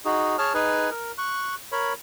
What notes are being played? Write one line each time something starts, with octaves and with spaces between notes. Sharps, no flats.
D#4 F#4 G#4
G#4 C#5 A5 F6
D#4 G#4 B4 G#5
A#4
C#6 F#6
A#4 C#5 B5